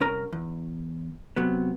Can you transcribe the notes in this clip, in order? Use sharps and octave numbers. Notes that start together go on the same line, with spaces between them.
C2 C#4 A#4 A#5
E2
C3 F#3 B3